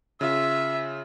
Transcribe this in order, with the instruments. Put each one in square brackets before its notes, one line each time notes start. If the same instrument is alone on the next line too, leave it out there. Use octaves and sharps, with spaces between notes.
[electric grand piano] C#3 F4 [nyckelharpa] E5